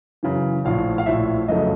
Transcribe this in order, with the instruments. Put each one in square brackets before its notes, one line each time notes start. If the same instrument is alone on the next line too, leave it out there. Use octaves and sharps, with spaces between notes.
[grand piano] F#2 C#3 E3
A#1 A2 F3 F5
F5
A#1 A2 F3 E5
F#1 F2 C#3 F#3 A3 D#5